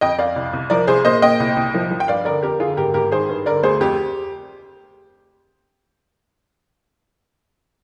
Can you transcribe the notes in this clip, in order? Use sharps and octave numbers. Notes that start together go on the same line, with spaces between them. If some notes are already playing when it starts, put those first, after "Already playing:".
F2 D#5 G5
F2 D5 F5
C2
C2
F3 A#4 D5
C2 G#4 C5
A#2 C5 D#5
A#2 D#5 G5
C2
C2
F3
F3
G5
G2 D5 F5
D3 A#4 D5
F2 G4 A#4
D3 F4 G#4
G#1 G4 A#4
G#1 G4 A#4
D#3 G#4 C5
G2
D3 A#4 D5
D2 G#4 C5
F2 G4